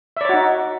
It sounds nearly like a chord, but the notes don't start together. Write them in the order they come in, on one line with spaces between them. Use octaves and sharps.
E5 D5 C#5 F#4 D#4